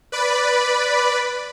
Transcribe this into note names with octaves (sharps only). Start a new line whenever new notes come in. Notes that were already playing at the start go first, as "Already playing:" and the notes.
B4 D5 B5